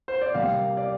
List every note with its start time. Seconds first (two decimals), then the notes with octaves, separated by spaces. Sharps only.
0.08 C5
0.22 D5
0.34 C3 G3 A#3 F5
0.77 D5